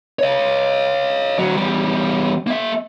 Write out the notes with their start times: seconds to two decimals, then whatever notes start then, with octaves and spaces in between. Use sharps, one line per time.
0.19 C#5 D#5
1.39 D2 F#3
1.57 E2 G3
2.47 A#3 E5